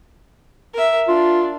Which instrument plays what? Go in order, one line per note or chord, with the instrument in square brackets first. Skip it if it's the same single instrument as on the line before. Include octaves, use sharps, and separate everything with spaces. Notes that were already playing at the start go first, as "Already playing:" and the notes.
[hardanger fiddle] A#4 E5
[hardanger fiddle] D4 [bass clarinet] F4